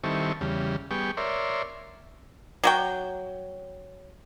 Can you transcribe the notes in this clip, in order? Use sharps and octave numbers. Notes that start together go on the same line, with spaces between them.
D#3 G3 C4 E4 A4 C#6
E2 C#3 G3
G3 B3 G#4 G5 C#6
A#4 C#5 D5 E5 C6
F#3 F#4 G5